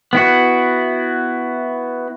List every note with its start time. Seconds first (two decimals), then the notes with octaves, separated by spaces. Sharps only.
0.13 B3 E4 F#4